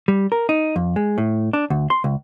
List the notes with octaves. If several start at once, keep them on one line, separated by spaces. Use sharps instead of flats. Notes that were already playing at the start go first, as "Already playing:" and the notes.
G3
A#4
D#4
F2
G#3
A2
D4
D2
C6
C#2